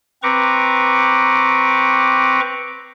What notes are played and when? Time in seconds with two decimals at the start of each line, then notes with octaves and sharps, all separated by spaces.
0.23 C4 B4 A#5 C#6 D6